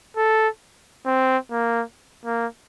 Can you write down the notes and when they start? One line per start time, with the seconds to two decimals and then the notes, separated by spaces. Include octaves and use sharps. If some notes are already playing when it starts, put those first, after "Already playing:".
0.17 A4
1.06 C4
1.51 A#3
2.25 A#3